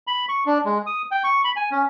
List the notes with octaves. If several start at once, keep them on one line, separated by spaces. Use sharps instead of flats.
B5
C#6
D4
G#3
D#6
G5
C#6
B5
G#5
C#4